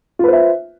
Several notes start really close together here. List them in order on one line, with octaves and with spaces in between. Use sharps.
F4 B4 C5 E5